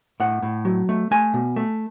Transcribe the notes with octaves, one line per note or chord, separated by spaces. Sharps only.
A2 F#5
A2
F#3
A3
A3 G#5
B2
A3